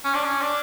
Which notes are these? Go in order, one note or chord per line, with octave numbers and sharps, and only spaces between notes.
C#4
D4
C#4
D4